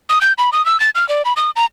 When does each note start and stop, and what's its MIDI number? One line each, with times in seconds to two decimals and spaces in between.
0.09 0.19 87
0.21 0.33 91
0.38 0.50 83
0.53 0.64 87
0.66 0.79 88
0.80 0.90 93
0.95 1.07 89
1.09 1.22 74
1.25 1.33 83
1.37 1.50 87
1.56 1.65 82